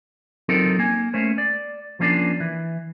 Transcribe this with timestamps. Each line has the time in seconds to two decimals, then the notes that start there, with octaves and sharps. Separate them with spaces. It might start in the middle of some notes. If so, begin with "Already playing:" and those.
0.49 F#3 C4 D#4 F4 A4 A#4
0.79 A#3 G#5
1.14 A3 A#3 C#4 C5
1.38 D5
2.00 F3 A#3 C#4 D4 D5
2.40 E3